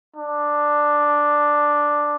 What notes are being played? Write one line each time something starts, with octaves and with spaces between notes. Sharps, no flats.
D4